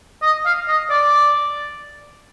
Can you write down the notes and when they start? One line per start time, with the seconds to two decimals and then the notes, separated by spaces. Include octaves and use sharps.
0.22 D#5
0.46 F5
0.68 D#5
0.90 D5